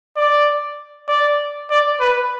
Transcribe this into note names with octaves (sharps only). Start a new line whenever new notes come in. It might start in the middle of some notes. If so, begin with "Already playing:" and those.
D5
D5
D5
B4